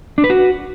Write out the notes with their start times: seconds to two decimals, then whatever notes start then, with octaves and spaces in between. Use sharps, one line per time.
0.18 D4
0.24 B4
0.30 F#4